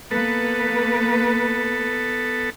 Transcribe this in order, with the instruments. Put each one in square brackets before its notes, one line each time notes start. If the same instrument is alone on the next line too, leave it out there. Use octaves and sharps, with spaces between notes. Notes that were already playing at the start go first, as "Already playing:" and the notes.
[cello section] A#3 B4 [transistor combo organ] B3 A4